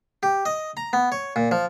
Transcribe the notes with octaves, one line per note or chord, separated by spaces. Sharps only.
G4
D#5
A#5
B3
C#5
A#2
F3